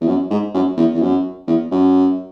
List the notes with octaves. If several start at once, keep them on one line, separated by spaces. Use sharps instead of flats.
E2
F#2
G#2
F#2
E2
E2
F#2
E2
F#2